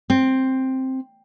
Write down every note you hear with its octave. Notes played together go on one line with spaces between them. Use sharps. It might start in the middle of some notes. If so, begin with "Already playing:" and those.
C4